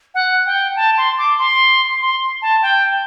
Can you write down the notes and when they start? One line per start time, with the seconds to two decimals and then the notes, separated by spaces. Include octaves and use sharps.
0.15 F#5
0.46 G5
0.76 A5
0.97 C6
1.18 D6
1.38 C6
2.01 C6
2.42 A5
2.62 G5